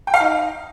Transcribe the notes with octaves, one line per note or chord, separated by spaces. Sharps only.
G5
F5
D#4